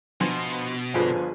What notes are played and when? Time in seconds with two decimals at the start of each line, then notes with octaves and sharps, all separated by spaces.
0.21 B2 F3 B3 D4 C6
0.94 G1 D3 F3 F4 G#4 B4 G#5